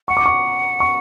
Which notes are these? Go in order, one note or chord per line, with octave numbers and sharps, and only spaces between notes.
F#5 C#6
D6
C#6
C#6